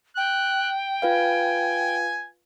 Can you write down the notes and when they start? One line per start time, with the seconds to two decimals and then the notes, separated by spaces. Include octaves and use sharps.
0.17 G5 F#6
1.02 F4 B4 F5 G#5